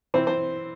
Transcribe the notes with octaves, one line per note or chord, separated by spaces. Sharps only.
E3 C4 C5
C4 C5